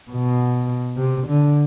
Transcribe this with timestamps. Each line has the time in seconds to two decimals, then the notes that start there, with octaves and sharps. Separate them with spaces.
0.11 B2
0.97 C3
1.27 D3